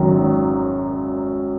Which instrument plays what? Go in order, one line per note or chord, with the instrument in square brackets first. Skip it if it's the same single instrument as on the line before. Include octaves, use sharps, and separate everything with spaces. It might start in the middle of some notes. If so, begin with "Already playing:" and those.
Already playing: [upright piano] G#1 F#2 D#3 F#3